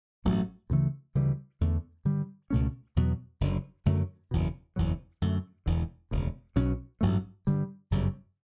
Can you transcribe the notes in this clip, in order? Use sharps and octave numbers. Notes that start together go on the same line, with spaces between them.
A1 G2 F#3 A3
D2 C#3 E3 A3
D2 C#3 E3 G3
E2 D3 A3
G2 D3 G3
C#2 B2 A3 C#4
E2 B2 F#3 B3
F#1 F#2 D3
F#2 D3 F#3 A3
F#1 E2 B2
F#1 E2 B2 F#3
F#2 D3 A3
E1 E2 D3
E1 D2 C#3
B1 B2 F#3 C#4
A1 G2 F#3 A3
G2 D3 G3
G1 F#2 C#3 G3